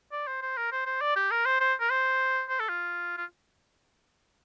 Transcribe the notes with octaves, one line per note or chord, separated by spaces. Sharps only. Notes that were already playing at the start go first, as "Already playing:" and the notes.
D5
C5
C5
A#4
C5
C5
D5
G4
A#4
C5
C5
A#4
C5
C5
A4
F4
F4